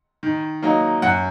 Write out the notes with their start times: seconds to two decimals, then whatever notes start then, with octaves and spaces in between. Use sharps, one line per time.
0.23 D#3
0.63 F#3 A#3 D#4
1.02 F#2 F#5